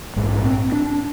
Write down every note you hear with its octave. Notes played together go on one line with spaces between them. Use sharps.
A#1 G#2 G#3
C4
D4